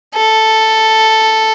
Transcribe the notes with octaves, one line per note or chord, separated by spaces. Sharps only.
A4